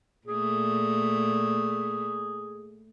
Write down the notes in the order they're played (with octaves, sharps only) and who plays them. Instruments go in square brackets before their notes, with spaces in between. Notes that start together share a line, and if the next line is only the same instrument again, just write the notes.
[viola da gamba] A#2 A3 [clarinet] G#4